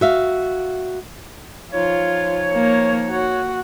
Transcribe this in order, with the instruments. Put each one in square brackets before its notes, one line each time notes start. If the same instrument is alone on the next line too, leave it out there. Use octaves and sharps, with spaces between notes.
[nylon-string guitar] F#4 E5 F5
[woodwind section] F3 D#4 C#5 [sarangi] F4
[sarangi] A#3
F#4